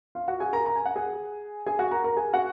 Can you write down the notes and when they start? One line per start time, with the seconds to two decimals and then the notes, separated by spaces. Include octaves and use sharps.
0.15 F4 F5
0.28 F#4 F#5
0.40 G#4 G#5
0.53 A#4 A#5
0.66 A#5
0.76 G#5
0.85 F#5
0.96 G#4 G#5
1.66 G#4 G#5
1.79 F#4 F#5
1.91 A#4 A#5
2.04 A#4 A#5
2.17 G#4 G#5
2.33 F#4 F#5